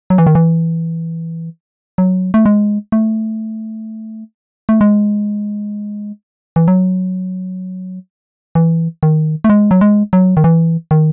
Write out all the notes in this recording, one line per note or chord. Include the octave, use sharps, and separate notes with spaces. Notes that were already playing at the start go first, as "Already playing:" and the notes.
F#3
E3
D#3
E3
F#3
A3
G#3
A3
A3
G#3
E3
F#3
E3
D#3
A3
G#3
F#3
G#3
F#3
D#3
E3
D#3